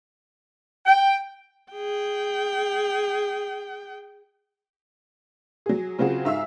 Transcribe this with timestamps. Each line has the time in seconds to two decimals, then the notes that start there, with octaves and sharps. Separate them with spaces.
0.86 G5
1.73 G#4 G5
5.66 F#3 G#4
5.98 C#3 F#3 C4 F4 F#4 G#4
6.25 G#2 E5 F5 E6